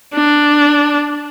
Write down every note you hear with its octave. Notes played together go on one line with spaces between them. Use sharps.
D4